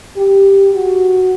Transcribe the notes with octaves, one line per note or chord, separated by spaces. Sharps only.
G4
F#4